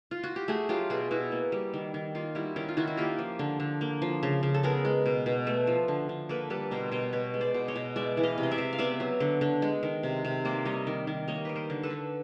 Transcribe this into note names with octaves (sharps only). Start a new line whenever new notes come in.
F4
F#4
G4
A3 F#4 G#4
F#3 F4 G4
B2 F#4 G#4
B2 E4 F#4
A#3
G3
D#3
D#3
A#3 D#4 F4
G3 E4 F#4
D#3 C#4 D#4
F4
D#3 E4 F#4
F#4
A#3 F4 G4
F3
D3
D3
A#3
F3
C#3
C#3
A4
B3 G#4 A#4
G#3
B2
B2
A3
F3
D3
D3
A#3 A4 B4
G3 A4 B4
B2 A#4 C5
B2 C#5 D#5
B3 B4 C#5
G#3
C5 D5
B2
C#5 D#5
B2
G#3 D5 E5
E3
D#5 F5
C3
D#5
D5 E5
C3
F5
B3 D5 E5
F#3
D3
D3
G#3
D#3
C3
C3
A#3 C5 D5
G3 C#5 D#5
D#3
D#3
A#3 C#5 D#5
G3 B4
A#4 C5
D3
A4 B4
D3